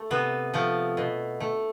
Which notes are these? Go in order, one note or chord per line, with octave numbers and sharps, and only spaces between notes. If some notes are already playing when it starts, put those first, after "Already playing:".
Already playing: A3
C3 B3
F3 A3
B2
A3